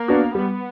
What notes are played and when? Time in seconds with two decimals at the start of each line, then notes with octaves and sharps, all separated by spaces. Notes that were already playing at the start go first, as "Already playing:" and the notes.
Already playing: A#3
0.08 B3 D4 F#4
0.35 G3 B3